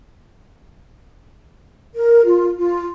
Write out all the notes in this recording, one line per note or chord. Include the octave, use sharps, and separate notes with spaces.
A#4
F4
F4